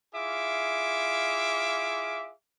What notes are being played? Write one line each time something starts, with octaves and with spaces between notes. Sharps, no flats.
E4 F4 G#4 E5 F5 D6